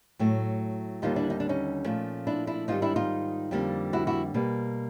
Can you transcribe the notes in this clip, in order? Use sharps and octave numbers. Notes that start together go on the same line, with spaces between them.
A2 F#3 A3
D#2 D3 G3 A#3 D#4 F4
D4 E4
D#4
D4
C#4 D#4
A#2 F3 A3
D4 E4
D4 E4
G#2 D#3 G3 D#4 F4
D4 E4
D#4 F4
F2 D3 G3 A#3
E4 F#4
E4 F#4
B2 G3 A#3